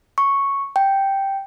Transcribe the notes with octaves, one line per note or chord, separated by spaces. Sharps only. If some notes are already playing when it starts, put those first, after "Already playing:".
C#6
G5